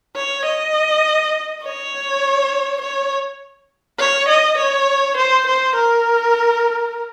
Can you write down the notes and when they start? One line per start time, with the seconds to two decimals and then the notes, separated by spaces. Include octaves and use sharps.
0.16 C#5
0.45 D#5
1.64 C#5
2.81 C#5
3.99 C#5
4.29 D#5
4.58 C#5
5.17 C5
5.47 C5
5.76 A#4